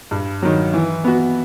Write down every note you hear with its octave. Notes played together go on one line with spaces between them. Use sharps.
G2
D#3 F#3
E3
B3 F#4